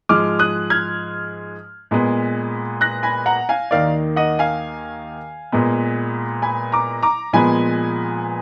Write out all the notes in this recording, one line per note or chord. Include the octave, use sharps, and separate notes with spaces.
G#2 F3 G#3 D6 F6
D#6 F#6
F6 G#6
A#2 G#3 B3
F#6 A#6
G#5 B5
F#5 A#5
F5 G#5
D#2 D#3 A#3 D5 F5
D#5 F#5
F5 G#5
A#2 G#3 B3
G#5 B5
A#5 D6
A#5 D6
A#2 F3 G#3 B3 G#5 B5